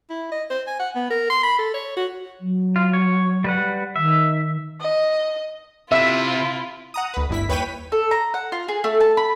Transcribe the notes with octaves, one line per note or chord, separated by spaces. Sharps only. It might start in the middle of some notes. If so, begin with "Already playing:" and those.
E4
D#5
C5
G#5
F#5
B3
A#4
C6
B5
A4
C#5
F#4
F#3
F4
C#5
G3 B4 F#5
D#3 E5
D#5
C3 E4 F4 E5
F#5 A#5 D#6
D2 B4
G1 E4 B6
D#2 B4 C#5 G5 B6 D#7
A4
A#5
F#5
F4
G#4
A3
A5
B5